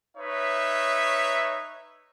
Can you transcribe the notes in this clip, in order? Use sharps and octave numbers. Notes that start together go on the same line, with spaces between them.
D#4 B4 C#5 E5